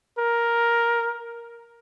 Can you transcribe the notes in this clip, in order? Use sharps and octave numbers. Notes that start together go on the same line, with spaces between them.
A#4